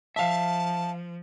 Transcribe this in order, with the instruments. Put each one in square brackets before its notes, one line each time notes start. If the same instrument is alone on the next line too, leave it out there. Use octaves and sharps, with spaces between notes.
[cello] F3 [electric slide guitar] E5 F5 [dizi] A5